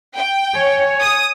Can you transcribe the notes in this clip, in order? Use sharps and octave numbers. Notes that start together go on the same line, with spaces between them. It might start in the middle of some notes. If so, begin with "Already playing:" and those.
G5
C#5 G#5
D#6